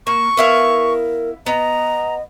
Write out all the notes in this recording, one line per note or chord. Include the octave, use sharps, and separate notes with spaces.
A#3 C#6
B3 E4 A#4 F5
B3 D#5 A#5